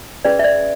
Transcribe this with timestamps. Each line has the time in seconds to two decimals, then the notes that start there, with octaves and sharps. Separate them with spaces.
0.25 C#4 G#4 B4 D5
0.39 E5
0.44 D5